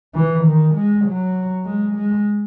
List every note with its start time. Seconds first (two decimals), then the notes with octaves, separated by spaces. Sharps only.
0.15 E3
0.44 D#3
0.74 G#3
1.05 F#3
1.65 G#3
1.95 G#3